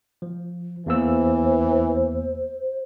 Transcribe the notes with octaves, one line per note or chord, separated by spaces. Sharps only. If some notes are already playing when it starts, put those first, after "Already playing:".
F3
E2 E3 A#3 C5 E6